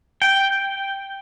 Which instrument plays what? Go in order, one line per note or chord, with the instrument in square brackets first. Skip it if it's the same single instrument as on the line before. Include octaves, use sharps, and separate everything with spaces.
[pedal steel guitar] G5